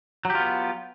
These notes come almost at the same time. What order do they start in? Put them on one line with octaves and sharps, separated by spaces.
F#3 G4 F4 B3